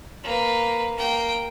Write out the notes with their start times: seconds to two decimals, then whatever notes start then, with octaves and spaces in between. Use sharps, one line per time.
0.24 A#3 B4
0.97 A#3 G5